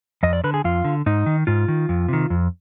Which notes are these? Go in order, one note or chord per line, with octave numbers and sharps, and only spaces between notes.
F2 D#5
D5
D3 B4
G#4
F2 F4
D3
G#2 D#4
D#3
G#2 F4
D#3
F2
C3 D#3
F2